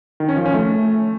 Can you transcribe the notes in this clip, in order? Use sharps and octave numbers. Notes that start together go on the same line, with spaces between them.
D#3
C#4
F3
C#4
A3